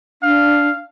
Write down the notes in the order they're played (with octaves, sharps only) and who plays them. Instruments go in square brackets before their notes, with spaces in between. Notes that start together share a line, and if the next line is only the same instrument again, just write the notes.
[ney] D4 [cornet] F5